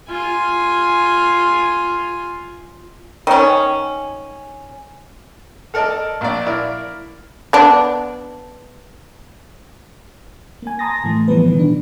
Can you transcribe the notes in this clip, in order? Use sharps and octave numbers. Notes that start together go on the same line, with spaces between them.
F4 G#5
D#3 C#4
A4 A#4 D5 D#5 A5
A#1 D5
E4 A#4 D5
B3 D4
A#3 G#5
A5 A#5 C6 D#6 A6 A#6
A2 E3 A3
E3 F3 G3 B3 B4
B2 D#3
D4